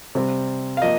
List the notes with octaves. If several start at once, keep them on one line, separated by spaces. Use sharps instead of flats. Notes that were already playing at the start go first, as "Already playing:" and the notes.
C3 G3 C4
F5
F3 A#3 D#5